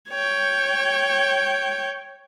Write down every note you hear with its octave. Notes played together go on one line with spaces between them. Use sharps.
C#5 G5